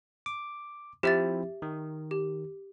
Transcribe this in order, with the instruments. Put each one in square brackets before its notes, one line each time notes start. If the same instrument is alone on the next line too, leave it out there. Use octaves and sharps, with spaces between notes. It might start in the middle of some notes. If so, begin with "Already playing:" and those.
[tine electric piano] D6
[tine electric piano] F3 C4 E4 [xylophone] G4 E5 A6
[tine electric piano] D#3
[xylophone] G4